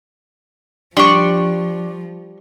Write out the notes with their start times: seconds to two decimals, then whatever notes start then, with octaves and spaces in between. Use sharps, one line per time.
0.97 F3 G3 D4 D5 C6 C#6